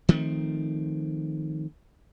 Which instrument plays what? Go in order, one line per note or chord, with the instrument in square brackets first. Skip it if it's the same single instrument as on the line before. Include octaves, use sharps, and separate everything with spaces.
[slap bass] D#3 F3 A3 C4